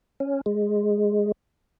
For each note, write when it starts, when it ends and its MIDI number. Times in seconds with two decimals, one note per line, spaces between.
0.20 0.41 61
0.46 1.32 56